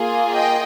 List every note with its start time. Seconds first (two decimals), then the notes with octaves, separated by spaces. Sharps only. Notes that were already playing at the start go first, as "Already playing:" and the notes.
Already playing: A#3 F4 G#4
0.32 D#5 G5